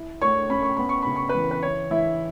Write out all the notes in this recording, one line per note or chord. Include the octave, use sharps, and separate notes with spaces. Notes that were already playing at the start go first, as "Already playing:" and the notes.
Already playing: E4
A3 C#5 C#6
C#4 B5
C#6
B3 B5
C#6
C#3 B5
C#6
B4 B5
E3
B4
E4 C#5
E3 E4 E5